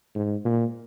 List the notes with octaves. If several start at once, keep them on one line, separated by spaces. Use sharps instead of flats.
G#2
A#2